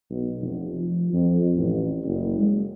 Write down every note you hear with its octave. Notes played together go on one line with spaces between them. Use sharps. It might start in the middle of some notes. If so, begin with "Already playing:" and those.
B1
F1
F3
F2
A1
F#1
G#3